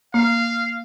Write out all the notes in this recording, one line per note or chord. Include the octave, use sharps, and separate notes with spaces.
A#3 F5